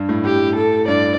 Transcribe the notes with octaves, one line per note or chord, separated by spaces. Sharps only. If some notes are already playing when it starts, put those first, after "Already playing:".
Already playing: G2
A2
A2 G4
A4
G2 D5